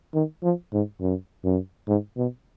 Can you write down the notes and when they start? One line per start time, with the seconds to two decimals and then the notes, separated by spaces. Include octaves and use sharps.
0.14 D#3
0.43 F3
0.73 G#2
1.00 F#2
1.44 F#2
1.88 G#2
2.17 B2